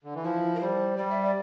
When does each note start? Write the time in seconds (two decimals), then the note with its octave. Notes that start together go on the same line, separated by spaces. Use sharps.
0.04 D3
0.15 E3
0.24 F3 E4
0.55 A#4
0.61 G3 C5
0.98 G3 D5
1.11 E5
1.25 D5